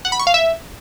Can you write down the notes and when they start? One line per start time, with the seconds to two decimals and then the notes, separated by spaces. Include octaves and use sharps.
0.05 F#5
0.12 B5
0.19 C#6
0.27 F5
0.34 E5